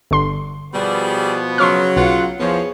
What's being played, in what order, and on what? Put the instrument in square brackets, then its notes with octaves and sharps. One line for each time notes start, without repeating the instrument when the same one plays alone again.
[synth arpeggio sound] G1 D3 C6
[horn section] B2 F3 B3 [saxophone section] G3 G#4
[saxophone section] C#3 F#3 [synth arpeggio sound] C6 C#6 F6
[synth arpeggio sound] B1 B2 [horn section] F4 F#5
[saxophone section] E2 F3 [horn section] B3 G#4 C#5